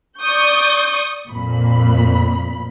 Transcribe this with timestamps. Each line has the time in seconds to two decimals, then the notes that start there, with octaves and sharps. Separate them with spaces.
0.20 D5 C#6 D#6 G6
1.29 F2 A#2 B5